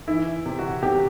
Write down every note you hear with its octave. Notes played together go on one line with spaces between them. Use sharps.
E3 E4
C3
F#4
C3 G4